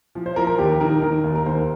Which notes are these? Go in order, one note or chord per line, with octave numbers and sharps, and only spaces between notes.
F3
C5
F3 A#4
A#4
D#2 G4
D#3 A#4
D#3 A#4
D#2
A#4
D#2 C5